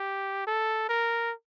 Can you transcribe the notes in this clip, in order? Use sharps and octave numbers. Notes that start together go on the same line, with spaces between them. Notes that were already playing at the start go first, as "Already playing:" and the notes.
Already playing: G4
A4
A#4